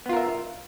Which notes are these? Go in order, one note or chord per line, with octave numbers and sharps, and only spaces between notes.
B3 F4 A#4 E5